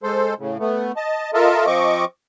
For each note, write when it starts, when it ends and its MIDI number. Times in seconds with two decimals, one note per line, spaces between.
0.03 0.34 56
0.03 0.34 69
0.03 0.34 72
0.39 0.57 45
0.39 0.57 49
0.60 0.92 57
0.60 0.92 59
0.96 1.31 75
0.96 1.31 81
1.34 1.66 65
1.34 1.66 69
1.34 1.66 70
1.34 1.66 75
1.34 1.66 76
1.34 1.66 81
1.66 2.05 53
1.66 2.05 60
1.66 2.05 75
1.66 2.05 85
1.66 2.05 86